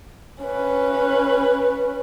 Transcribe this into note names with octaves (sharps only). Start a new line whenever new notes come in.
C#4 B4